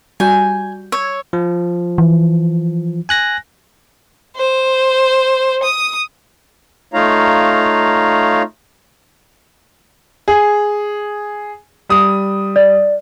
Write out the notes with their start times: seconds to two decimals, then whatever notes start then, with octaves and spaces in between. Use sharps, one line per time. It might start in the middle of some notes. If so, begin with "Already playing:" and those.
0.20 G3 F#4 G#5 G6
0.92 C#5 E6 G#6
1.33 F3
1.98 E3
3.09 G#5 F#6 A#6
4.36 C5
5.63 D#6
6.94 A3 D#4 F4 C#5 F5 A#5
10.28 G#4
11.89 G3 D#6
12.56 D5